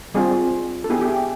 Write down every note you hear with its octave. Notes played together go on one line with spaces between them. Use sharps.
G3 C4 F4 G#4
A4
B3 E4 G4 G#4
G4
G#4